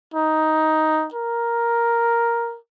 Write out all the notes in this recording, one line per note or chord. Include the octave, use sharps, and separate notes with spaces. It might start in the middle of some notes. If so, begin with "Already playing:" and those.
D#4
A#4